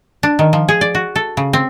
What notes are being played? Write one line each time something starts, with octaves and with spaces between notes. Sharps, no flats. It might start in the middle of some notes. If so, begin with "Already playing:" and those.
D4
D#3
F3
G#4
D5
F#4
A4
C#3
C4